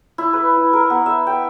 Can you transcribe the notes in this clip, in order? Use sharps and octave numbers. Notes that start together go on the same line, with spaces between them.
E4
B4
E4
A#4
B3
E5
G5